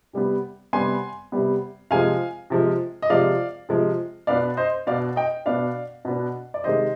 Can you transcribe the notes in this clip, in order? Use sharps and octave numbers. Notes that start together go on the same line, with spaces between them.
C3 G3 B3
C3 G3 B3 G#5 C6
C3 G3 B3
C3 F3 G#3 F5 G#5
C3 F3 G#3
D#5
C3 F3 G#3 D5 F5
C3 F3 G#3
B2 B3 D4 D5 F5
C5 D#5
B2 B3 D4 D5 F5
D#5 G5
B2 B3 D4 D5 F5
B2 B3 D4
D5
C3 D#3 G#3 C5 D#5